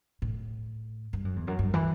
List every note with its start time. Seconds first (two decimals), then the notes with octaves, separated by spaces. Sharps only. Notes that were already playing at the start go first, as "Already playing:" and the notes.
0.22 A2
1.13 G2
1.25 F#2
1.36 E2
1.47 F#2
1.59 G2
1.74 E3